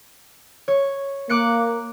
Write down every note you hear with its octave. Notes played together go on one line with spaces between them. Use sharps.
C#5
A#3 D6 F#6 C#7